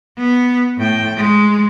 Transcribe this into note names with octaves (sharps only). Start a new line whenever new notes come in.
B3
A2 G5
G#3